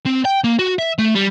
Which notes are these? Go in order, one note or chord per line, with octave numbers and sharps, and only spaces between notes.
C4
G5
A#3
F#4
E5
A3
G3